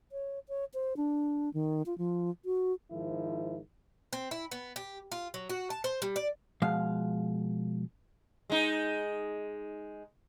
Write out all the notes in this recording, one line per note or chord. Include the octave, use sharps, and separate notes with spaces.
C#5
C#5
C5
D4
D#3
F4
F3
F#4
G#2 D#3 F3 E4
C4
E4
B3
G4
F4
F#3
F#4
A5
C5
G3
D5
B2 F3 G#3 F5
G#3 D#4